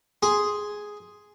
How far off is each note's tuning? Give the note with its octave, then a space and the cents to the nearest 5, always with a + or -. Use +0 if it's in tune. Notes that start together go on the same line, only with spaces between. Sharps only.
G#4 +0 C6 +0